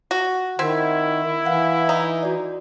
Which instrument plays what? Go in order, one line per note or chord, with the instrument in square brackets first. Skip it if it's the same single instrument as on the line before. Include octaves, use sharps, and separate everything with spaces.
[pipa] F#4 [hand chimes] A#6
[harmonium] D#3 [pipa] C4 [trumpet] E4 [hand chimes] F#5 G#6 B6
[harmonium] E3 [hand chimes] F5 F#5
[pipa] D#4
[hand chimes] F#4 D5